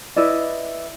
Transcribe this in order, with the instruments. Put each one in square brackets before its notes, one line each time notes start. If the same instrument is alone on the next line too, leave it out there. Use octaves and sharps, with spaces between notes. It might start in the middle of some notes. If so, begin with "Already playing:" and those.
[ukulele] E4 B4 D5 D#5